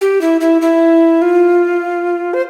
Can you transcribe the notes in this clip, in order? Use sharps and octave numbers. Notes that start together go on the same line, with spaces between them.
G4
E4
E4
E4
F4
C5